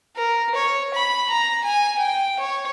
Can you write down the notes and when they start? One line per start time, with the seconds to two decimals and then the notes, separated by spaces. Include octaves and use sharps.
0.16 A#4
0.55 C#5
0.94 B5
1.30 A#5
1.64 G#5
1.99 G5
2.40 C#5